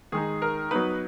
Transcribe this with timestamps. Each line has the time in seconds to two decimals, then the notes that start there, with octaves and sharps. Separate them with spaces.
0.12 D#3 G#3 D#4 G#4
0.42 A#4
0.71 F#3 B3 D#4 B4